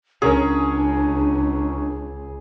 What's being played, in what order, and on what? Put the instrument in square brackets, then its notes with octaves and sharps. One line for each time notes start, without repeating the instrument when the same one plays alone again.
[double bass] C#2 [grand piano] C#4 A#4 C#5 [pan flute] D4 [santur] G#4